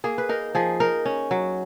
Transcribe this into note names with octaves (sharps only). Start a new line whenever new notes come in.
A#3 G#4
B4
D#4 A#4
F3 G#4
D#4 A#4
C#4
F#3